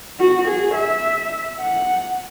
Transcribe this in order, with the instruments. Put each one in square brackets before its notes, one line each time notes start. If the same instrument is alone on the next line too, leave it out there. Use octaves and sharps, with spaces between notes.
[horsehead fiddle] F#4
G#4
E5
F#5